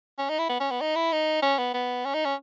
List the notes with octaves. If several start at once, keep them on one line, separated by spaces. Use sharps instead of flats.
C#4
D#4
E4
B3
C#4
B3
D#4
E4
D#4
C#4
B3
B3
C#4
D#4
C#4